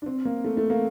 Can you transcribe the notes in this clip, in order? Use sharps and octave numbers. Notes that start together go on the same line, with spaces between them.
D4
C4
A#3
A3
A3
A#3